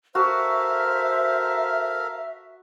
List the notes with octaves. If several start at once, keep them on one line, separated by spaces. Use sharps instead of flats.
F#4 A4 A#4 C5 E5 F5